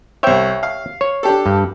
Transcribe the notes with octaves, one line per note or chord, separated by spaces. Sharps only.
C2 C5 C#5 E5 G5
F5
C#5
D4 G4 A4
G2